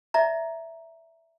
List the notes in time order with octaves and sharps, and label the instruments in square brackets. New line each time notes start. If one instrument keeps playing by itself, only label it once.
[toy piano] D5 E5 A#5